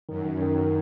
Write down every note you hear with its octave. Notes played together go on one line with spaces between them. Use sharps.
F#2 D#3
D#3
F#2 D#3
D#3